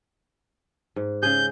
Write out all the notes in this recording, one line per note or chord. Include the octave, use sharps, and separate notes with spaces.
G#2
C#3 G#4 G6